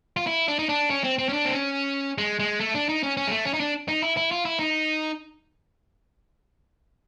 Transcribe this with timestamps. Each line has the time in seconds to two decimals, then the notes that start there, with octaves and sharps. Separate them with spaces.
0.17 F4
0.27 E4
0.48 D4
0.59 D#4
0.69 D4
0.90 C#4
1.04 C4
1.19 C4
1.29 C#4
1.33 D4
1.45 C4
1.54 C#4
2.18 G#3
2.40 G#3
2.60 A3
2.75 D4
2.89 D#4
3.03 C#4
3.17 C#4
3.28 G#3
3.32 A3
3.45 C#4
3.54 D#4
3.60 D4
3.88 D#4
4.02 E4
4.17 E4
4.31 F4
4.45 E4
4.59 D#4